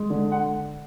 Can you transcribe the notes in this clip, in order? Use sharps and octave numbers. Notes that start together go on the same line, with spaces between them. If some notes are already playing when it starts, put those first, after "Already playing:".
Already playing: G#3
D3
F#5